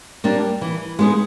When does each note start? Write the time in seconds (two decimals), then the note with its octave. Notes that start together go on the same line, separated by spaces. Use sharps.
0.24 G3 A#3 D4
0.61 E3
0.99 G#3 B3 D#4 G#4